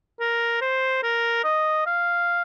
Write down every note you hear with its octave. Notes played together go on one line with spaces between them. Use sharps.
A#4
C5
A#4
D#5
F5